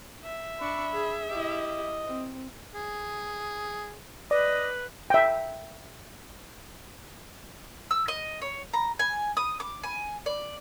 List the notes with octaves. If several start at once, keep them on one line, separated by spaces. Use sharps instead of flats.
E5
D4 B5 C#6
G#4
E4 G4 D#5
C4
G#4
B4 D5 D#5
E5 G5
E6
D#5
C#5
A#5
G#5
D#6
D6
G#5
D5